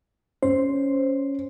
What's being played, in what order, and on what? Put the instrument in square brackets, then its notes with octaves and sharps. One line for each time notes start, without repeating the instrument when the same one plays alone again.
[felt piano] C#4 [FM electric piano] C5